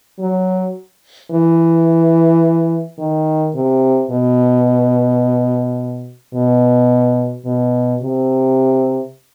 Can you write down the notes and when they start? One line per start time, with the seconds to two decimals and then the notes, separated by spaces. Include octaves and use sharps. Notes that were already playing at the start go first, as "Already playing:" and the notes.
0.20 F#3
1.31 E3
2.99 D#3
3.55 C3
4.11 B2
6.34 B2
7.45 B2
8.02 C3